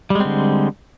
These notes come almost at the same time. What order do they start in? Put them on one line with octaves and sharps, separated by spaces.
G3 G#3 C4 D3